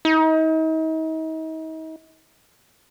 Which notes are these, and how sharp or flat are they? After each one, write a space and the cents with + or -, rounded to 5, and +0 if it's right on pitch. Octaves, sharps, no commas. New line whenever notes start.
D#4 +40